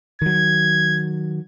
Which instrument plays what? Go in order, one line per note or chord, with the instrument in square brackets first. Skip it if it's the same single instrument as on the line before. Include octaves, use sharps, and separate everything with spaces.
[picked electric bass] D#3 F#3 [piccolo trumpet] G#6